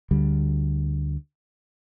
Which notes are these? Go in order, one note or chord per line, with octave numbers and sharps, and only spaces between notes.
D2 D3 G3